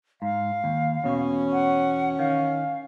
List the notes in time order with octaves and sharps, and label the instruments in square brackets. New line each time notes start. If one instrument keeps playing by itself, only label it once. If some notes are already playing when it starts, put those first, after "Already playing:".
[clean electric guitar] G#2 [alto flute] F5
[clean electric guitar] D#2
[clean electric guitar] E2 B2 [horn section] C#4
[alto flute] F#5
[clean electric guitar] D#3 [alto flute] F5